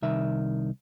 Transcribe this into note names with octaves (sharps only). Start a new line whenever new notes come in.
C2 D#3 E5